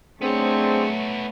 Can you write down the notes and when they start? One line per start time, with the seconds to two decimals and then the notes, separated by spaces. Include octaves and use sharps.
0.22 A3 B3 C4 D4 G#4 C5 C#5